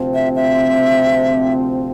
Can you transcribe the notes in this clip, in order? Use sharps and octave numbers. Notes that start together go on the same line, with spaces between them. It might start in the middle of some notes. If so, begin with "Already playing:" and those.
Already playing: D2 C3 F3 C4 F4
E5
E5